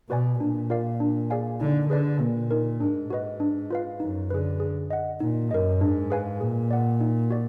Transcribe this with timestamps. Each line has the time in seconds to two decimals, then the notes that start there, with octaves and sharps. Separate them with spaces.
0.10 B2 F#4 B4 D5 G#5
0.40 A#2 D4
0.70 F4 A#4 D5 F5
1.00 D4
1.30 G#4 D5 F5 G#5
1.60 D3 D#4
1.90 D3 G#4 B4 D5
2.20 A#2 A#3
2.51 D#4 A#4
2.80 G#2 D4
3.10 F#4 B4 D#5
3.40 D4
3.71 F4 B4 F5
4.00 F#2 D#4
4.30 D3 G#4 B4
4.60 G#4
4.90 D#5 F#5
5.20 A#2 D#4
5.51 F#2 A#4 D#5
5.81 G#2 D4
6.10 G#4 B4 F5 G#5
6.41 A#2 G#4
6.71 D5 F#5
7.01 D#4
7.30 F#4 D5